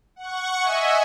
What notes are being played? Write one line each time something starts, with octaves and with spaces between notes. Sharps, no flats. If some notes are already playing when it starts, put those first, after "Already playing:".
F#5 C#6
D#5 E5 G#5